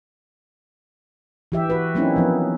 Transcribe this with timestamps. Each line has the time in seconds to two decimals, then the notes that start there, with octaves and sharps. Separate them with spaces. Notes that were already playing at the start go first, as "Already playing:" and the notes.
1.52 E3 G4 E5
1.70 F#4 B4
1.95 F#3 A#3 C4 C#4 D#4 E4
2.16 F3 B3